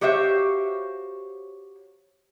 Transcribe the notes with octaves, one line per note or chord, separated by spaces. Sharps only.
F#4 G4 C5 C#5 E5 F5